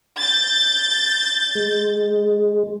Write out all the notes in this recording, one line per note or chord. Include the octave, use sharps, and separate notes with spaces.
G6 A6
G#3